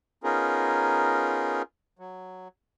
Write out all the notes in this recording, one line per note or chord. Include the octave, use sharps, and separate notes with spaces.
B3 C#4 D#4 F4 G#4 A#4
F#3